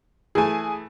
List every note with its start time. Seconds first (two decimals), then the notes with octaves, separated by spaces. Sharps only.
0.35 E3 A3 G#4 G#5